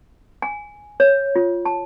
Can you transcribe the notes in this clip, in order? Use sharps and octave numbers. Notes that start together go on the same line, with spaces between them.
G#5
C#5
F4
A5